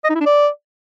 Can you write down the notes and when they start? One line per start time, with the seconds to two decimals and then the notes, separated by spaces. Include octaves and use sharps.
0.04 D#5
0.10 D#4
0.15 E4
0.20 D4
0.26 D5